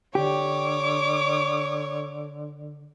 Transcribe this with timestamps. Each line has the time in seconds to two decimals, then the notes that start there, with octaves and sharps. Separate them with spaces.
0.15 D3 G4 C#5 D6